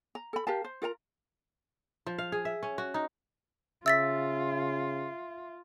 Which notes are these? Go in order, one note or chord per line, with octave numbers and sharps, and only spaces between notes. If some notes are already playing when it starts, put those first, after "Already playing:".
A#5
A4 B5
G4 A#4 F5 A5
C5
F4 A#4 F#5 A#5
F3
F5
G#4
E5
C#4
F#4
D#4
C#3 F4 E5 E6 A6 B6